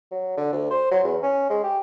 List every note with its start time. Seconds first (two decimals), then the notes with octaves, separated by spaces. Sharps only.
0.12 F#3
0.37 D3
0.53 D2
0.71 C5
0.91 F#3
1.04 E2
1.23 C#4
1.50 G#3
1.63 G4